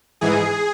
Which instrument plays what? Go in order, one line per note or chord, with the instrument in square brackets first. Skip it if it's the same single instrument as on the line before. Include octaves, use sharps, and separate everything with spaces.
[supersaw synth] G#2 E3 G#4